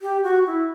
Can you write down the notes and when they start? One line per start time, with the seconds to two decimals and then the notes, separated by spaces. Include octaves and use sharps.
0.02 G4
0.23 F#4
0.47 E4